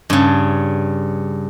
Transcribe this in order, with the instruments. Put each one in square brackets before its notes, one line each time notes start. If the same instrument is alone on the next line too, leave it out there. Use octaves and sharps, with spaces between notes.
[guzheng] G2 C#3